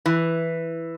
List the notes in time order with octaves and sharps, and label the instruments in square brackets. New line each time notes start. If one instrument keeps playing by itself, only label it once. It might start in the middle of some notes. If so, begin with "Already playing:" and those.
[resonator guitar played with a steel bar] E3